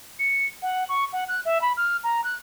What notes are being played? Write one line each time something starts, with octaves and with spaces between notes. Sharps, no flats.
C#7
F#5
C#6
F#5
F#6
E5
B5
F6
A#5
F#6